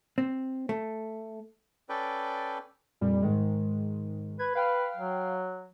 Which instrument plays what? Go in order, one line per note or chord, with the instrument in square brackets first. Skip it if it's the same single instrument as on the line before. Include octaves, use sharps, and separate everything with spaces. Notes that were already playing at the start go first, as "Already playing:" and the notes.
[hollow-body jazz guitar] C4
A3
[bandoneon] C#4 A4 B4 D5 G5
[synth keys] F2 A#2 G3
G#2 D#3 G#3
[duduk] B4 [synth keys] G#6
[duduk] B4 [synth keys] F5 G5 F6
[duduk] F#3